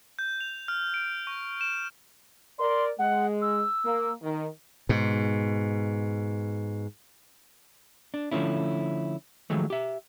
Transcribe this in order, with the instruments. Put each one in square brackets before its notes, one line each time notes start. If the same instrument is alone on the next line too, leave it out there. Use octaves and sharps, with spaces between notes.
[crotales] G6
F7
F6
D7
C#6
E7
[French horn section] A#4 D5 [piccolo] C6
[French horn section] G#3 [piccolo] F#5
[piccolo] E6
[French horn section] A#3
D#3
[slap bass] G#2 B2
[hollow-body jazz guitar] D4
D3 F3 A3 C#4 E4
D#3 F3 F#3 G#3 A3
G4 E5